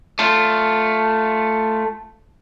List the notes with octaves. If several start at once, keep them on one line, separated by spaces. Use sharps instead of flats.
A3 F4